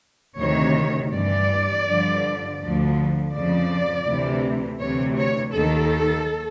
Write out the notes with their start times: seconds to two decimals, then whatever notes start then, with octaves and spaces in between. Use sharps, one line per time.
0.39 D2 C3 D#3 C#5
1.13 G2 E3 D5
1.87 G2 D3 F3
2.60 D2 D3 F3
3.34 F2 C#3 F3 D5
4.07 D2 C3 E3
4.80 D2 C3 E3 C#5
5.18 C#5
5.54 D#2 D#3 A4